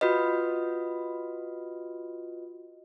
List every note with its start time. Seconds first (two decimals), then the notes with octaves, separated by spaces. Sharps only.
0.01 F4 F#4 B4 D#5